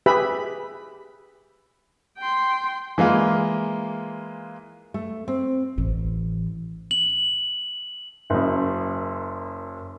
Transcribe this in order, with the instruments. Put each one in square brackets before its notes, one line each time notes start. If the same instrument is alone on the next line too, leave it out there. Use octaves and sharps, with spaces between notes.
[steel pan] G4 G#4 B4 E5 B5
[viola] G5 C6
[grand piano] E3 G#3 A#3 F4
[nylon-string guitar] A3
C4
[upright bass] A1 E3
[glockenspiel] F#7
[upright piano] F#1 F#2